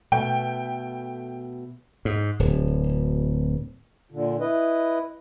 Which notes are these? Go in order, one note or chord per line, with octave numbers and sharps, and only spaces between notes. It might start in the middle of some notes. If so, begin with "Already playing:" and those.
B2 A3 G5
G#2
D1
A#2 D3
E4 B4 D#5